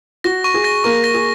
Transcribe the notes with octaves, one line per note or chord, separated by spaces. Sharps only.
F#4 A#6
C#6
G#4
A#6
A#3 A#4 C#6
A#6
G#4